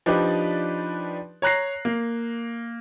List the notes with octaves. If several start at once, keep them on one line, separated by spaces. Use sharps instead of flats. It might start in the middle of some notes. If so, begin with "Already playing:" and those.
F3 D4 D#4 G4 B4 D5
C#5 A#5 F#6 A#6 C7
A#3